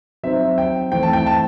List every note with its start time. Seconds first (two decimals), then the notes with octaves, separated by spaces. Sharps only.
0.23 F#3 C4 D#4 E5
0.58 G5
0.92 E3 A3 C4 G5
1.03 A5
1.13 G5
1.26 A5